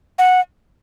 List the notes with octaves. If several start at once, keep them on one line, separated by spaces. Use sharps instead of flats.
F#5